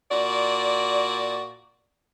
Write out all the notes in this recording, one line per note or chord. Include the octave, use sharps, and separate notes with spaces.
A#2 F#4 D5